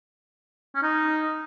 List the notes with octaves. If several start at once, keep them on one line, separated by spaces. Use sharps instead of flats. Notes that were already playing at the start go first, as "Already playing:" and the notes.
C#4
D#4